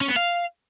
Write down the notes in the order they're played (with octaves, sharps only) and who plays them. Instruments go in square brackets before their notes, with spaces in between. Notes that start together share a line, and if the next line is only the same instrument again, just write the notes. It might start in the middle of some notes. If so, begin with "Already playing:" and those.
[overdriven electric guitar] C#4
B3
F5